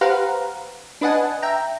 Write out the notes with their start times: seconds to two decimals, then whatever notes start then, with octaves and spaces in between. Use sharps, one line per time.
0.01 G4 B4 C5 F5 F#5 A#5
1.01 D4 B4 D#5 F#5 G#5 A5
1.42 E5 G5 A#5